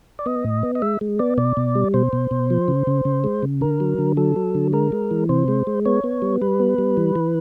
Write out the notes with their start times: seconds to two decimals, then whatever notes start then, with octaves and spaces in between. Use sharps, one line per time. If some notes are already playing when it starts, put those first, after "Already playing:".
0.19 D5
0.26 B3 D#5
0.44 A2
0.63 B3
0.75 D#5
0.82 G#3 E5
1.01 G#3
1.19 B3 D5
1.38 B2 D5
1.57 B2
1.75 G3
1.94 B2 C5
2.13 B2
2.31 B2
2.50 F3
2.68 C#3
2.87 C#3
3.05 C#3
3.24 G#3
3.43 C#3
3.61 D3 A#4
3.80 F#3
3.98 D3
4.17 F#3 A4
4.36 F#3
4.55 D3
4.73 G#3 A#4
4.92 G#3
5.11 E3
5.29 C3 C5
5.48 G#3
5.67 G#3
5.85 B3 C#5
6.04 B3
6.22 G3
6.42 G3 B4
6.60 B3
6.78 G3
6.97 E3
7.15 E3